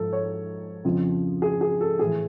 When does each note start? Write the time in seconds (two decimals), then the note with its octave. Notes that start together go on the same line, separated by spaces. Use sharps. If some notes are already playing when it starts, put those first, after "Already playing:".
Already playing: G#2 F3 A4
0.13 C#5
0.85 F2 C#3 F3
1.42 G#4
1.61 G#4
1.81 A4
1.99 A2 E3 G#4